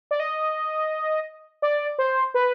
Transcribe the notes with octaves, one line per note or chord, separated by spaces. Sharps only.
D5
D#5
D5
C5
B4